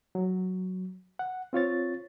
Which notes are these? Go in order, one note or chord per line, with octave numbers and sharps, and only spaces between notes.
F#3
F#5
C4 F4 C#5 A6